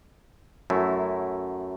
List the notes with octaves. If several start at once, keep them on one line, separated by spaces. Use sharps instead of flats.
F#2 F#3 A3 E4